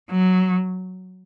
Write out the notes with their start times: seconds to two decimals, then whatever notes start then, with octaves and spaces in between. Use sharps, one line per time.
0.10 F#3